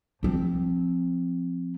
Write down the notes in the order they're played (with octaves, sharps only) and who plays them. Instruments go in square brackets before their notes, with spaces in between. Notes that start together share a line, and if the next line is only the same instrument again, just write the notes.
[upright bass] F3 C4